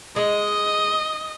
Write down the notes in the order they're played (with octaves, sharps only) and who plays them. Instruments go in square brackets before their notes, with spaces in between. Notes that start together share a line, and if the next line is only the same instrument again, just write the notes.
[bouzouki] G#3 [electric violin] D#5